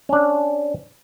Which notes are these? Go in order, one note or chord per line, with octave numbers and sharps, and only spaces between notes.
C#4 D4